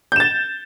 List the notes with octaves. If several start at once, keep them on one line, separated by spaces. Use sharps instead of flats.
G6 A6 E7